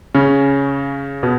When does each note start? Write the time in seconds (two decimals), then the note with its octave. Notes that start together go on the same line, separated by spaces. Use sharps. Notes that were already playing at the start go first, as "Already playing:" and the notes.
0.14 C#3 C#4
1.23 B2 B3